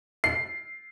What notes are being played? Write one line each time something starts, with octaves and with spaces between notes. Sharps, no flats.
C7